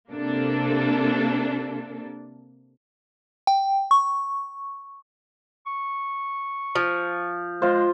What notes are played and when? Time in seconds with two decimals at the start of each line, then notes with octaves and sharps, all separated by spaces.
0.11 C3 A#3 D4 A4
3.47 G5
3.91 C#6
5.66 C#6
6.75 F3
7.62 G#3 F4 C5